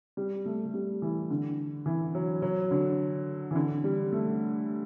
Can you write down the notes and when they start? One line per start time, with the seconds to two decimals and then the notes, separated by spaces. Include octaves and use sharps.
0.17 G3
0.45 A3
0.65 A3
0.74 G3
1.02 E3
1.30 D3
1.86 E3
2.15 F#3
2.42 F#3
2.71 D3
3.51 E3
3.55 D3
3.84 G3
4.13 A3